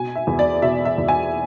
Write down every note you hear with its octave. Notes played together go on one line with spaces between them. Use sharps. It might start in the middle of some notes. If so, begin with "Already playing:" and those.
Already playing: B2 G#5
E5
E2
D5
B2 E5
E5
E2
G#5